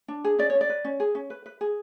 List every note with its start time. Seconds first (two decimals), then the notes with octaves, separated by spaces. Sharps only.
0.08 D4
0.24 G#4
0.39 C#4 D5
0.50 C#5
0.55 C#4
0.61 D5
0.69 B4
0.85 C#4
1.00 G#4
1.15 C#4
1.30 B4
1.46 B4
1.61 G#4